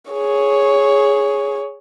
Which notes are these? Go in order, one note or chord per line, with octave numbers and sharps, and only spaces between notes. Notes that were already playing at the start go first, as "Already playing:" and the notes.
G#4 C#5